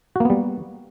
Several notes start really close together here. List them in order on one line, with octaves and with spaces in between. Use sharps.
F#4 A#3 B3 G3